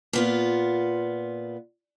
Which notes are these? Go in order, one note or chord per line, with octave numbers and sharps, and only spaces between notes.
A#2 B3 F4